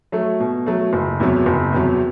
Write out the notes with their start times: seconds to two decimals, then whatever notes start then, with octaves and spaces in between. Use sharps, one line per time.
0.12 F#3 A3
0.40 B2
0.66 F#3 A3
0.93 F#1
1.20 E2 C3 F#3
1.46 F#1
1.73 E2 C3 F#3